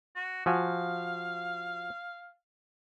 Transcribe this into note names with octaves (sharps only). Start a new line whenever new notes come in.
F#4
F3 F#4 F5 G#5